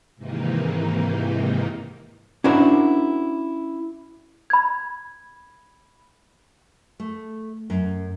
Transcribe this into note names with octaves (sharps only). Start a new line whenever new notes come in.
G#2 C3 D#3 E3 A#3 D#4
C#4 D4 E4 F#4 A#4 C5
B5 G#6
A3
F#2